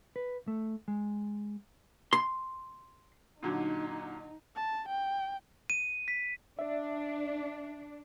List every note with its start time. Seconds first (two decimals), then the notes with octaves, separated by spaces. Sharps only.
0.16 B4
0.48 A3
0.88 G#3
2.13 C6
3.43 A#2 D3 F#3 D#4
4.55 A5
4.88 G5
5.70 D#7
6.08 B6
6.59 D4 D5 E5